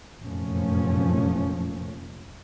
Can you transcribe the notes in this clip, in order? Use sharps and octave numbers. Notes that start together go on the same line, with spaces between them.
F1 F#2 A#2 F3 A3 C#4